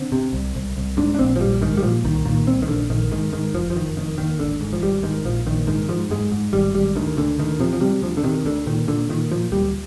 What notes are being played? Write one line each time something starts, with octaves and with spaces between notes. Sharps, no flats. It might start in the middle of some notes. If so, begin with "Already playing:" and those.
Already playing: D3 C4
C3
C2
C2
C2
G#2 D4
D4
A#1 C4
F3
A#1 G3
G#2 D#3
G3
A#2 F3
C2 D#3
A#2 D#3
C2 C4
D#3
A#1 D3
A#1 D#3
G#2 D#3
G#2 D#3
F1 F3
F3
F1 D#3
F1 D#3
D#2 D#3
G#1 D3
G#2
F3
G#1 G3
G#2 D#3
A#1 F3
A#1 D#3
G#2 D#3
G#2 F3
G#2 G#3
G#2
G#1 G3
G#1 G3
D2 D#3
D2 D3
D2 D#3
C3 F3
F3
C3 G3
D2 F3
D3
C3 D#3
D2 D3
A#2 D#3
A#2 D3
A#2 D#3
A#2 F3
D2 G3